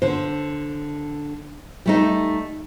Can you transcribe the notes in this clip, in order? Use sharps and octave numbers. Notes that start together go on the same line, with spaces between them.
D3 C5
G3 A3 D#4